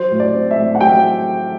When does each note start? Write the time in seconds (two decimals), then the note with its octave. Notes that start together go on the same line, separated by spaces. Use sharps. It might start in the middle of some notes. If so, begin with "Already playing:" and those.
Already playing: F#3 C5
0.11 A2
0.20 D5
0.34 C4
0.51 E5
0.58 A2
0.75 F#5
0.81 F#3 G5